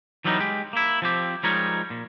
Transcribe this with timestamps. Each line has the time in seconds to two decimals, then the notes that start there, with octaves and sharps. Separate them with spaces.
0.25 E3 F#3 G3 B3 D4 D#4
0.39 G#3 G4
0.73 A#3 E4
1.02 F3 C4 G4
1.43 F3 G3 G#3 D#4 A#4 C#5
1.90 A#2